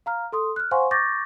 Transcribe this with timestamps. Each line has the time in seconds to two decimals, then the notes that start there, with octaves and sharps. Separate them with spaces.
0.06 F5 A#5 F6
0.32 A4 C6 D#6
0.56 F6 F#6
0.71 C5 F5 F#5 G#5 C6 C#6
0.91 C#6 D6 G6 A6 A#6